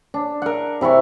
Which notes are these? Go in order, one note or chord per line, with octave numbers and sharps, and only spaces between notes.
D4
A#4 F#5
C3 E4 G#5 C#6